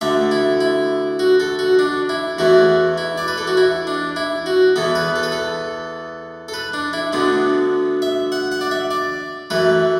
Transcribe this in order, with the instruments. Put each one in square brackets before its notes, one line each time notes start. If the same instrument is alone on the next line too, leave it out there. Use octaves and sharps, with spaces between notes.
[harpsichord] D2 D3 A3 E5
E4
E4
F#4
A4
F#4
D4
E4
E2 E3 A3 F#4
E4
D5
B4
A4
F#4
E4
D4
E4
F#4
E2 E3 B3 A4
B4
A4
B4
A4
A4
B4
D4
E4
D2 D3 B3 D4
E5
F#5
F#5
D5
E5
D5
F#2 E3 A3 B4